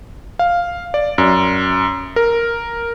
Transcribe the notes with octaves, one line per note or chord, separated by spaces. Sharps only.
F5
D5
F#2
A#4